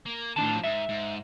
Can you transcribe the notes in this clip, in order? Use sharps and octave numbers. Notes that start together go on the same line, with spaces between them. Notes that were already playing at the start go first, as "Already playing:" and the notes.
A#3
A2 D#3 D4 F4 A5
F3 F#3
G#2 E5
G#2